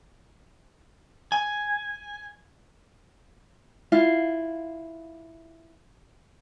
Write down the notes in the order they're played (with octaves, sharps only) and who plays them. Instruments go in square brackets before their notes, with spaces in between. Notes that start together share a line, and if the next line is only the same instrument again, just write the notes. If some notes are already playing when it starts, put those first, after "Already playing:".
[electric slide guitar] G#5
[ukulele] E4 F4 F5